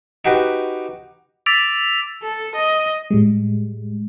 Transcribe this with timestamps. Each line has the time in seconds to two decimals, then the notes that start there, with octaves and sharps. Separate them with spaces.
0.25 D#4 F#4 G4 B4
1.46 D6 E6 A6 B6 D7 F7
2.23 A4
2.55 D#5
3.10 A2 G3 G#3